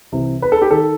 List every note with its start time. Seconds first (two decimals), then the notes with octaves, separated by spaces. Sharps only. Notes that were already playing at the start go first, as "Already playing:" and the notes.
0.12 C2 C3 E3
0.42 B4
0.52 A4
0.62 G4
0.71 D#3 A4